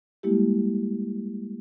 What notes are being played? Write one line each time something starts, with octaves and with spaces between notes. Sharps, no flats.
G3 G#3 A#3 E4 G4